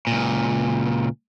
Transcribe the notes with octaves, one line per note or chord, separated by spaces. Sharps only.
C#2 A#2